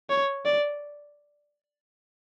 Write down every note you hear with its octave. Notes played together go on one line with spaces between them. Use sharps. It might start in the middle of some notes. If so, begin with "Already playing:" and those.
C#5
D5